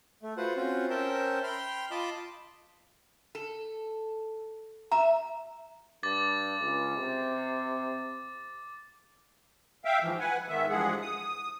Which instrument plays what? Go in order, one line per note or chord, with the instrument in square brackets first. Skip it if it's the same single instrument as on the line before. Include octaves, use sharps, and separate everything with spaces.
[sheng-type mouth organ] A3
F4 F#4 B4 C5 F#5
C4 C#4 F4 F#4
C#4 A#4 C5 E5 G5 A5
G5 B5 C6 F6
F4 D#5 A5 B5 C6 D6
[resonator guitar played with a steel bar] A4
[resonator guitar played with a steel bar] E5 [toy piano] A#5
[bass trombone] G2 [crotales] D6 A6
[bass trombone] C#2
C3
[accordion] E5 F5 G5
G#2 E3 F3
B4 F#5 G#5
G#2 D#3 B3 E5
G2 E3 F3 G#3 G#4 F#5
D#6